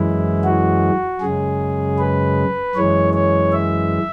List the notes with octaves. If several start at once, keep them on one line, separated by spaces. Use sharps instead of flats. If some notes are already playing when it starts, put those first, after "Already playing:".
Already playing: F#2 E3 G#3 E4
F#4
F#2 C#3 G#3 G#4
B4
F#2 E3 G#3 C#5
C#5
E5